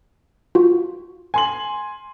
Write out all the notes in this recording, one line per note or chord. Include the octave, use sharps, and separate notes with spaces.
F4 F#4
G#5 C6 F#7